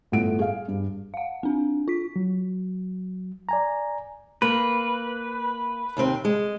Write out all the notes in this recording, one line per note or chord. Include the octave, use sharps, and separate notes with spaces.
G1 A2 A3 F4 F#5 D7
G#4 F5
G2
F5 F#5
C4 D4
F4 B6
F#3
D5 G#5 A#5
A#3 B4
D#2 C3 C4
G#3